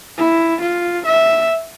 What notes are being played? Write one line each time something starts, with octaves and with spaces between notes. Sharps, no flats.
E4
F4
E5